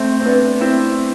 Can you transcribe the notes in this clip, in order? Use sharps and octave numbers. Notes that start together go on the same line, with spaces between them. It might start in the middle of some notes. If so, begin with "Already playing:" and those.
Already playing: A3 C4
C4
B3 D4
C4 E4